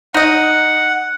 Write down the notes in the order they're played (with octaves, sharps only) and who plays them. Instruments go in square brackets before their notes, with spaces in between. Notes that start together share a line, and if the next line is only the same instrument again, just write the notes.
[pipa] D#4 D#5 [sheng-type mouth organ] F#5